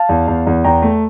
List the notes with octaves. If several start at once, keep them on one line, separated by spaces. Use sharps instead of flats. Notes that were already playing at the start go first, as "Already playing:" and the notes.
Already playing: F5 A5
E2
E2
E2
E2 G5 A#5
A3